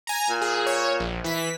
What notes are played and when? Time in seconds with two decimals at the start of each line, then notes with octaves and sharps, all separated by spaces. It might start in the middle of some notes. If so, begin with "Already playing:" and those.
0.07 G#5 A#5
0.29 A#2
0.41 G#4
0.66 C#5
1.00 A#1
1.24 E3 B6